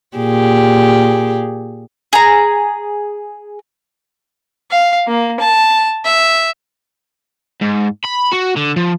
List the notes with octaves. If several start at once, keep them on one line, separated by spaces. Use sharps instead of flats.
A#2 G4 G#4
G#4 A#5
F5
A#3
A5
E5
G#2
B5
F#4
D3
F3